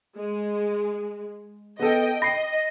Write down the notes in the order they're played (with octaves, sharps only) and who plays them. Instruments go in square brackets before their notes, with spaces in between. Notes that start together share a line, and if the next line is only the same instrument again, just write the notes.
[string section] G#3
[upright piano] B3 A4 [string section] D#5 G5
[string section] D#5 [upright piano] B5 C7 [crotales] A#6